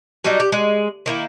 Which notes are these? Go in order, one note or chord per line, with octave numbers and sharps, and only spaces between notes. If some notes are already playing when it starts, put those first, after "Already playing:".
F#3 G3 D4 D#4
G4
G#3
D#3 A#3 E4